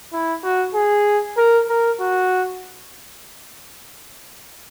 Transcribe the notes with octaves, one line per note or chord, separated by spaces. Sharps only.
E4
F#4
G#4
A#4
A#4
F#4